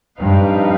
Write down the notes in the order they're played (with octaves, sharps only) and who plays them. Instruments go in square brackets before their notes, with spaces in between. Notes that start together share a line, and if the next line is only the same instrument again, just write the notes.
[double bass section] G2 [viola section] F3 C4 D#4 B4 F5